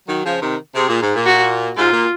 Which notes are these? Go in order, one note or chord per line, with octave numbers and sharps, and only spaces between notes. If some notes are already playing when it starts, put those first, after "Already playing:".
D#3 F#3
C#3 F3
C3 D#3
C3 G#4
A#2
G#2
A#2
F#4
G#2 F4
A#2